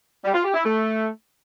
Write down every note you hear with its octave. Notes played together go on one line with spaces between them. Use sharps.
G3
F4
G4
E4
A3